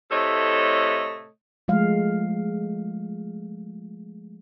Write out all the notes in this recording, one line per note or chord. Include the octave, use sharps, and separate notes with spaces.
A2 C3 A3 A4 C#5 D#5
F3 G#3 A3 F5